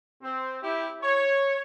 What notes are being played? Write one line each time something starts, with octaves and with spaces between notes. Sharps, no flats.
C4
E4 G4
C#5